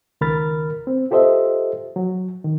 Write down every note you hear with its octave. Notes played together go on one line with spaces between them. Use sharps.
C#2 D#3 A#4 B5 F6 A6
C4
F4 G4 A4 C5 D#5 E5
F#3
D#3